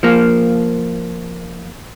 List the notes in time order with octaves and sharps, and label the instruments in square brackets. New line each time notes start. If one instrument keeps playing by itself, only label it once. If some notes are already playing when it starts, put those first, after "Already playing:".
[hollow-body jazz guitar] F3 A#3